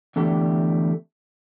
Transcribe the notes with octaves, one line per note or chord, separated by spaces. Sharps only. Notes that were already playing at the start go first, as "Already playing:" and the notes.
E2 D3 A3 G4